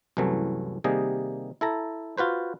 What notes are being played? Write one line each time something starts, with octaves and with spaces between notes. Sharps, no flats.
C2 F#2 E3 F#3 A3
C3 D#3 G3 A#3 G#4 D#5
E4 A4 A#5
F4 F#4 B4 C5